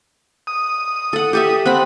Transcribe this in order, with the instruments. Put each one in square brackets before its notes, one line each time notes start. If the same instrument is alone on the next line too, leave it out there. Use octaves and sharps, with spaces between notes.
[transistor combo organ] D#6
[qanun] A4 F#5
G4 A4 E5
[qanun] C4 B5 [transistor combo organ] F#5